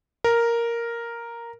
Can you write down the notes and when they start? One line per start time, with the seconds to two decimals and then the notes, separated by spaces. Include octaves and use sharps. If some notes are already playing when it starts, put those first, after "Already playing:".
0.24 A#4